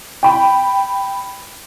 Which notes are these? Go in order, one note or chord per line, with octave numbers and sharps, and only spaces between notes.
G5 B5